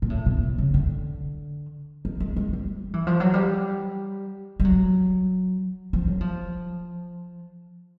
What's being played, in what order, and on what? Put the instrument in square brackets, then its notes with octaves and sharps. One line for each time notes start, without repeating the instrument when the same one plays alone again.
[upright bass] A#2
A2
B2
C3
C#3
D3
D#3
G#3
G#3
G3
E3
F3
F#3
G3
G3
F#3
F3
F#3
F3